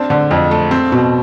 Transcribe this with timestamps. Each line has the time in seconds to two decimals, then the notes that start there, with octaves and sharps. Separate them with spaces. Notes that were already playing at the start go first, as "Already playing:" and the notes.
Already playing: C4 D4
0.10 D3
0.31 F2
0.51 A3
0.71 C4
0.92 B2